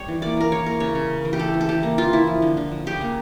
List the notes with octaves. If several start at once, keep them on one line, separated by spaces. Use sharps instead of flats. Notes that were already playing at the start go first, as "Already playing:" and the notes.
Already playing: G3 C#5
E3
A#3 D5
E3 A#4
A#3 C#5
A#3 A#4
C#3 C#5
C#3
A3
E3
G4
A3 A4
E3
A4
E3 G4
A#3
E3 F4
E3 E4
F3
D3
D3
F3
C#3 G4
A#3